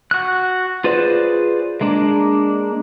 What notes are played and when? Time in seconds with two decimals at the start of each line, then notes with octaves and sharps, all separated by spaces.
0.11 F#4 F#6
0.84 F4 G#4 B4 C5 D5
1.81 G#3 A#3 D4